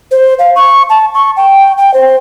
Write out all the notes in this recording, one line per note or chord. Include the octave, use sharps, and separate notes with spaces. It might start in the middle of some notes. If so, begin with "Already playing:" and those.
C5
F5
C#6
A5
C#6
G5
G5
C5